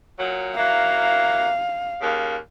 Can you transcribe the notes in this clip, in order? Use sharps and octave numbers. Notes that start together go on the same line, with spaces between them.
A#2 F#3
F#3 A#3 E4 F5
D#2 C#3 A#3